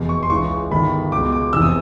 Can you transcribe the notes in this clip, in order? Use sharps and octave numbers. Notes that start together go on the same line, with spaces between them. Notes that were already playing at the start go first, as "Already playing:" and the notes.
Already playing: F1 E2 B2
C#6
C6
C#2 C#3 E3 C#6
G1 G2 D#3 B5
C#2 B2 D6
D6
F1 E2 C3 E3 E6
D#6